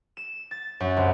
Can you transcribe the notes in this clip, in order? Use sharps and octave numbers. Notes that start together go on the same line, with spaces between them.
E7
A6
F#2
C2